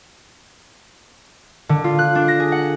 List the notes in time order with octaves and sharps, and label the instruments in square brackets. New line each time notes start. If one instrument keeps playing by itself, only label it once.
[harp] D3
F4
F#6
D4
A#6
G#4
F#5